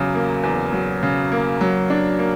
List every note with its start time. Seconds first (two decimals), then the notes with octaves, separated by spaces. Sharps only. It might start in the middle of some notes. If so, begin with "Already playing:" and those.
Already playing: E2 C#3 F#3
0.15 A#3
0.43 E2
0.73 F#3
1.03 C#3
1.32 A#3
1.61 F#3
1.90 D4
2.19 A#3